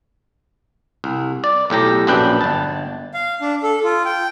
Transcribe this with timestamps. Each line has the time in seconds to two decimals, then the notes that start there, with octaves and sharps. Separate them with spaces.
1.04 C2
1.44 D5
1.70 B1 A2 G4 A#5
2.07 A#1 F#2 D4 B4 G5
2.41 G1 A5
3.14 F5
3.41 D4
3.63 A4
3.84 F4
4.05 G5